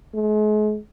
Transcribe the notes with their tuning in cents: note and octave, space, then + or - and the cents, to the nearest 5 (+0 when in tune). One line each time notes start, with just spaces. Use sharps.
G#3 +40